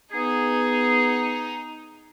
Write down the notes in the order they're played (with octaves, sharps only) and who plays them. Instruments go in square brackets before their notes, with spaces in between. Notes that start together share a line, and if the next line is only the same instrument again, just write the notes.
[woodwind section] B3 G#4 [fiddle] D#4